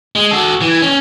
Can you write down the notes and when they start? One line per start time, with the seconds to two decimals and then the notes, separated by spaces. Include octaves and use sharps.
0.16 G#3
0.31 F#4 A4
0.62 E3
0.82 C#4